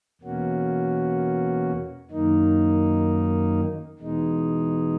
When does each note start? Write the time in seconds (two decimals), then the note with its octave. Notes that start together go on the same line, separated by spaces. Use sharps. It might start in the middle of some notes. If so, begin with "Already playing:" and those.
0.21 E2 B2 A#3 C#4 F#4
2.10 F#2 D#3 A#3 D#4
3.99 E2 B2 G#3 D#4